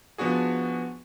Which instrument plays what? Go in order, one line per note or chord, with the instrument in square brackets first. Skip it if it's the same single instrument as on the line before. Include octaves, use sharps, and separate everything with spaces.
[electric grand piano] F3 B3 D4 F#4 G#4